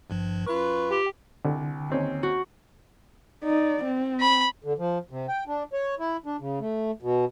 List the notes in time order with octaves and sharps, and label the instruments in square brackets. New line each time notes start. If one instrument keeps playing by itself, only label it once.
[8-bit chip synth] G#1 G2 F3
[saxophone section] F#2 F4 B4 [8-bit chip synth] C#6
[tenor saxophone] G4 [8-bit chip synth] G5
[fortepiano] C2 [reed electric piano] D3
[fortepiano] D#2 C4 C#4
[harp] F#4
[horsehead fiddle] D#4 D5
C4
[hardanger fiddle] B5
[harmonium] D3
F3
C3
G5
D4
C#5
E4
D4
C#3
A3
B2